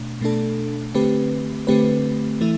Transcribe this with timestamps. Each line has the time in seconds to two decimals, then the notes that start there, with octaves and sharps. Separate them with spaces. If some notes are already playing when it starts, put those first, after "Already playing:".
Already playing: B2 A3 D4
0.21 B2 A3 D4 A4
0.94 D3 A3 C4 G4 B4
1.67 D3 A3 C4 G4 B4
2.41 E3 A3 E4